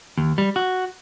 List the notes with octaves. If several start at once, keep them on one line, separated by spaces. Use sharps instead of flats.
D#2
G3
F#4